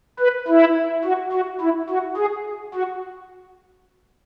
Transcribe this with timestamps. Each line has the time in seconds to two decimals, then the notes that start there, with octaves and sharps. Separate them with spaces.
0.19 B4
0.48 E4
1.04 F#4
1.32 F#4
1.61 E4
1.89 F#4
2.17 G#4
2.74 F#4